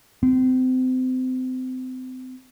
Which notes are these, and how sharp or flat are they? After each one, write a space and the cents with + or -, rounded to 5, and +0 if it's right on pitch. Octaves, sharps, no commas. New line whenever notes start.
C4 -30